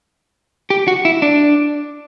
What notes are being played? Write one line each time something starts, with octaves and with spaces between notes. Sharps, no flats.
G4
F#4
E4
D4